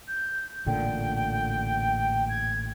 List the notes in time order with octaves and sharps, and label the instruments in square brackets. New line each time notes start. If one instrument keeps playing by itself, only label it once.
[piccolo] G6
[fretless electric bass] A1 A#2 D3 [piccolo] G5
[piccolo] G#6